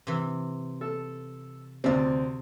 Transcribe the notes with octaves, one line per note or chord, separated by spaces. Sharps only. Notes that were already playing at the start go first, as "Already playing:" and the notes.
C3 E3
A4
D2 C3 C4 D5